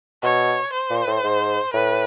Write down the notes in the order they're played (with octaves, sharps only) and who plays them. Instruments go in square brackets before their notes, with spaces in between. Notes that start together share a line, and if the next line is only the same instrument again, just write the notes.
[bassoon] B2 [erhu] C#5
[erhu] C5
[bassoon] A#2
A2
G#2
[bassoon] A2 [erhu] B4